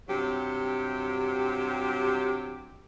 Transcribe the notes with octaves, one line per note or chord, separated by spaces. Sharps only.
G2 C3 F#3 G4